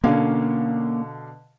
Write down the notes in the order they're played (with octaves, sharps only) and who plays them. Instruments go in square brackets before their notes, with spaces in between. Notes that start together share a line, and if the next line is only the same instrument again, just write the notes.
[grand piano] B2 D3 F5 [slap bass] A#3 C#4